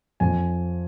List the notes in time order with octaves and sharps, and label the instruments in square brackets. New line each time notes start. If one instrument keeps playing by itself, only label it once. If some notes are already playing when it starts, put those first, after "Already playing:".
[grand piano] F2 G#5